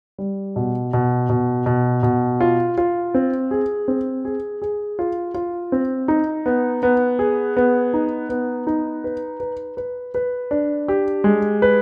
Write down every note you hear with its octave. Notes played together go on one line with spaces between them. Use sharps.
G3
B2
B2
B2
B2
B2
F4
F4
C4
G#4
C4
G#4
G#4
F4
F4
C4
D#4
B3
B3
G#4
B3
D#4
B3
D#4
B4
B4
B4
B4
D4
G4
G#3
B4